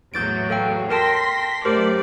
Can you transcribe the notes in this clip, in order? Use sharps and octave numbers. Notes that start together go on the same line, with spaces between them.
E2 A2 F#3 G6 A6 D7
A4 F5 G5
A#4 G5 A5 C6 A#6 B6
F#2 A3 G4 A#4 C5 D5